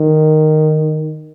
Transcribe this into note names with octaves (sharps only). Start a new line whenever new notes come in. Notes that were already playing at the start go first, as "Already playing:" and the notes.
Already playing: D#3